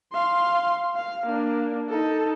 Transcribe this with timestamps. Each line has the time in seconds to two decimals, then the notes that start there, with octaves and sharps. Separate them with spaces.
0.13 F5 C6
0.96 F5
1.26 A#3 D4
1.89 D#4 A4